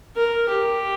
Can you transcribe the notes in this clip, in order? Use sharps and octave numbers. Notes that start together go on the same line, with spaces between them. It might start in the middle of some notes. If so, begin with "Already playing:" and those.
A#4
G4